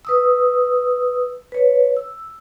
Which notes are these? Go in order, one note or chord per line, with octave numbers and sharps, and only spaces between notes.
B4 D#6 E6
B4 C#5
E6